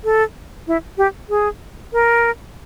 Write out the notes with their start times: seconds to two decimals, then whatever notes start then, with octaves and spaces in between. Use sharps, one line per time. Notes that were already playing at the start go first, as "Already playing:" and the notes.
0.04 A4
0.67 E4
0.98 G4
1.29 G#4
1.93 A#4